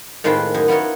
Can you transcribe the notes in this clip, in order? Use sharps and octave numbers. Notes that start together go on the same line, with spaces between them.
A2 D#3 G#3 C4 F4 B4
F#2 D#5 G#5
B3 E4 F4 A#4 C#5